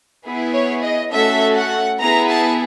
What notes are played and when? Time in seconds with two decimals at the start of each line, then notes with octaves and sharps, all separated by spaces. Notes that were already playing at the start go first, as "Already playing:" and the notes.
0.24 B3 E4 G#4
0.53 C#5
0.82 D#5
1.11 A3 C#4 F#4 A4 E5
1.55 F#5
1.99 B3 E4 G#4 A#5
2.28 A5